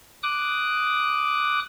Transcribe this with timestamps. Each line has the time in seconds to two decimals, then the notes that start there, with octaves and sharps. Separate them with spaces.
0.23 D6 D#6 F#6